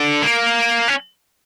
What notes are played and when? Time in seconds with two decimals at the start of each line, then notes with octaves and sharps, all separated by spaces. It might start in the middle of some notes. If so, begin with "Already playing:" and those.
Already playing: D3
0.22 A#3
0.88 C#4